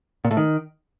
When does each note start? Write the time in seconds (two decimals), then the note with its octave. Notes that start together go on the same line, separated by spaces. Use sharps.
0.25 A#2
0.31 A2
0.37 D#3